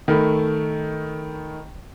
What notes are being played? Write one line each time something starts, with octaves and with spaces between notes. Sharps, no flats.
D#3 A3 B5